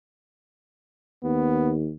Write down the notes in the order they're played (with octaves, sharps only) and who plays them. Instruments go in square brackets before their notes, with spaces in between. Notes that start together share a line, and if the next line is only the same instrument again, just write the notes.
[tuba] D#2 [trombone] B3